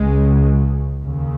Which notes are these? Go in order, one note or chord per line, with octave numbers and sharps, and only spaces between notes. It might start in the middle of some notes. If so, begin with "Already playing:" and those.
Already playing: C#2 C#3 G#3
D#2 C#3